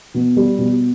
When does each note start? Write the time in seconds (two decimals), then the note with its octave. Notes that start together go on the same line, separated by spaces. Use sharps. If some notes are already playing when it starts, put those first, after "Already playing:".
0.14 B2
0.37 G3
0.58 B2